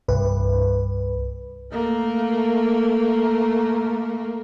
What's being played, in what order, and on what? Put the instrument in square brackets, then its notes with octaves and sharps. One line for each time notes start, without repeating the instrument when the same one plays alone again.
[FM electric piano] C2 G2 B4
[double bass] A3 A#3